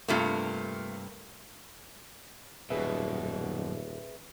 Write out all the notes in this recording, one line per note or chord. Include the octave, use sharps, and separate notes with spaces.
G2 C3 A3 A#3 F4
D#1 F#2 B2 G#4 B4 E5